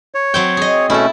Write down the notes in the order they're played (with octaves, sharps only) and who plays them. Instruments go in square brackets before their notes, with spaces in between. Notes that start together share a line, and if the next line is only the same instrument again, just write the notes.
[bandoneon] C#5
[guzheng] F#3 C4 G5
G#4 D#5
[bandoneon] B2 A3 C#4 [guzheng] E4 A4